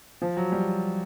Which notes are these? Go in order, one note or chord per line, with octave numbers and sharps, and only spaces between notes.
F3
F#3
G3